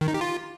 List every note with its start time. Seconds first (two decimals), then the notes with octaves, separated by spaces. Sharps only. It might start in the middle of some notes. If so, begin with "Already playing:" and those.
0.01 D#3
0.08 D#4
0.14 G4
0.21 F4